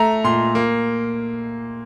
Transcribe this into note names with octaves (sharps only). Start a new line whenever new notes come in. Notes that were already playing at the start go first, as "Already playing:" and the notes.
Already playing: A3 A#5
A#2 C6
A#3